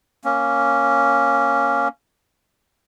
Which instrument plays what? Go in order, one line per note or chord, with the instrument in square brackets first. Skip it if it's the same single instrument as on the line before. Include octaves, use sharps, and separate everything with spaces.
[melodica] A#3 C#4